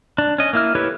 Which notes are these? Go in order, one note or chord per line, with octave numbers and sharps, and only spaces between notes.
D4
C#4 D#5
A#3 E4 F6
E4 G4 A4 B4 C#5